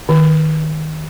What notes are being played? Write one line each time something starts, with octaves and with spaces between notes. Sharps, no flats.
D#3